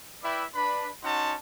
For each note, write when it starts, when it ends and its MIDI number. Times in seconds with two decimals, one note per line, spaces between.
0.23 0.44 64
0.23 0.44 71
0.23 0.44 74
0.23 0.44 76
0.23 0.44 79
0.23 0.44 83
0.54 0.88 62
0.54 0.88 71
0.54 0.88 83
1.03 1.34 61
1.03 1.34 63
1.03 1.34 66
1.03 1.34 78
1.03 1.34 81
1.03 1.34 84